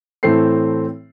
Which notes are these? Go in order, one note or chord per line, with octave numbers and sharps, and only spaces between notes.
A2 E3 A3 C4 A4 C7